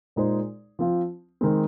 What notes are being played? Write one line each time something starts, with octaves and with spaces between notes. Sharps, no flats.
A#2 G#3 D#4 G#4 C5
F3 C4 F4
D#3 G#3 C4